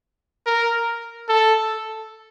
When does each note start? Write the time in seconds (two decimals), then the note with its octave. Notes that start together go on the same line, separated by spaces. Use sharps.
0.46 A#4
1.29 A4